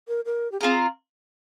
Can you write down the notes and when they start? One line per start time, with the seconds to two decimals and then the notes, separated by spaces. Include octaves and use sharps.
0.08 A#4
0.26 A#4
0.52 G4
0.60 C4 F4 G#4 A#4